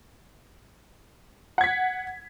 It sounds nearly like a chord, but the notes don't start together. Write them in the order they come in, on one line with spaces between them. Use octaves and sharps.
F#5 G#6 B6